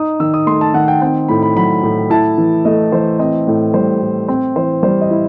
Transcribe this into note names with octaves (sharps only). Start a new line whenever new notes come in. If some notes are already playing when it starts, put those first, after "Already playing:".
Already playing: D#4 D#6
D#3 E6
D#6
A3 C6
A5
D#3 F#5
G5
C4 G5
A2 B5
B5
F#3 B5
A2
E4 A5
E3
A3 D#5
E3 C5
C4 D#5
A2
G3 C5
A2
C4
E3 C5
G3 C5
D#5
E4